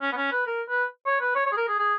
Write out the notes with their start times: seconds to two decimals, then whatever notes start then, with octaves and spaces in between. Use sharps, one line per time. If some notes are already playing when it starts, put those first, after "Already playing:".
0.02 C#4
0.12 B3
0.17 C#4
0.32 B4
0.47 A#4
0.69 B4
1.06 C#5
1.21 B4
1.35 C#5
1.46 C#5
1.52 G#4
1.57 A#4
1.68 G#4
1.79 G#4